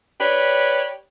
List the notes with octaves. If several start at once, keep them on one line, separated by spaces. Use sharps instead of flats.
G4 B4 C#5 D5